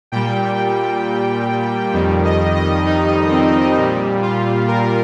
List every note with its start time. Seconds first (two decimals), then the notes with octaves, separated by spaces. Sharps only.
0.12 A#2 G3 G5
1.93 F2 D#3 G3
2.25 D#5
2.55 D#5
2.86 D#4
3.31 C4
3.77 A#2 G3
4.22 F4
4.68 A#4